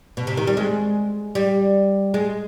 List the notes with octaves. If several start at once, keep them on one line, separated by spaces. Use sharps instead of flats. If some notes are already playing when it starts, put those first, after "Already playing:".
B2
C3
D#3
G3
G#3
G3
G#3